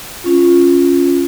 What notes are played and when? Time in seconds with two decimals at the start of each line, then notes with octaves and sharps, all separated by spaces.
0.24 C#4 F4